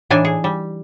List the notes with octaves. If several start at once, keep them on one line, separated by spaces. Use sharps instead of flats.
A2 E3 D4 D#4 G#5
G#4
G3